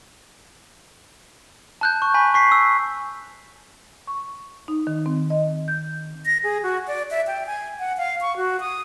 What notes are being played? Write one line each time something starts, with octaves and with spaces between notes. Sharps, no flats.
A5 F#6 G6
C#6
G#5 B5 G6 B6
C#6 B6 C7
E6
C#6
D#4
D#3
C4
D#5
G6
A#6
G#4
F#4
D5
E5
G5
G#5
F#5
F5
C#6
F#4
D#6